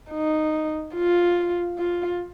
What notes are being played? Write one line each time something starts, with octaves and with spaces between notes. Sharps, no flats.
D#4
F4
F4